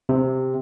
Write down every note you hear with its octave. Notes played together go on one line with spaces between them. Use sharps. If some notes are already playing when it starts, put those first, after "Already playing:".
C3